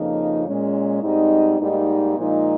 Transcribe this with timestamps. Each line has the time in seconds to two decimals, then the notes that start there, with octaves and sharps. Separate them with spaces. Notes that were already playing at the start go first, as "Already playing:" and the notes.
Already playing: F2 C#3 F3 A#3 D#4
0.45 A#2 G#3 C#4
1.02 G#2 G3 C4 D#4
1.59 G#2 G3 A#3 D#4
2.16 A#2 F3 G#3 D#4